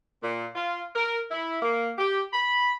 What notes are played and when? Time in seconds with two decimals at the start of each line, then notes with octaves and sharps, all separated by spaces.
0.23 A#2
0.56 F4
0.96 A#4
1.31 E4
1.62 A#3
1.98 G4
2.33 B5